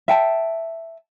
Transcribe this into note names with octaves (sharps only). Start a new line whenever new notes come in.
E5 G5 A5